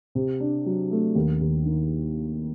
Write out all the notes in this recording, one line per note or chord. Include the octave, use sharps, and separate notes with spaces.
C3
D4
F#3
A3
D#2
D#2
D#3